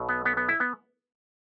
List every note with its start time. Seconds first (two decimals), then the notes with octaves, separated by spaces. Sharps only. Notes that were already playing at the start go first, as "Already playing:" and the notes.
Already playing: B1 B2 F#3
0.09 B3
0.25 B3
0.37 B3
0.49 E4
0.60 B3